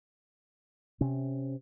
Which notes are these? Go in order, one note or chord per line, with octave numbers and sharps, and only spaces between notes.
C3 C#4